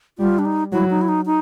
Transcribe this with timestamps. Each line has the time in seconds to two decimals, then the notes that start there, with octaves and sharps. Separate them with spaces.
0.18 G3 F4
0.39 D4
0.45 D#4
0.72 F#3 E4
0.90 D#4
1.01 E4
1.09 D#4
1.26 D#4